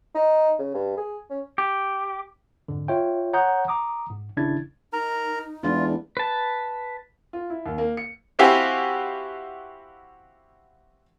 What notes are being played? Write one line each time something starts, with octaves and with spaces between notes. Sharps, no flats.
D#4
C#3
G2
G#4
C#4
G4
F2 G#2 D3
F4 C#5 E5 G5
C#5 F#5 A#5 D#6 G6
A#5 D6 D#6
G#2
G#1 C#3 D4 E4 G#6 A6
D#4 A#4 A#5
E2 G#3 D4 E4 F4
B4 A5
F4
E4
D#2
A#3
C#7
C4 E4 F#4 G4 F5 G#5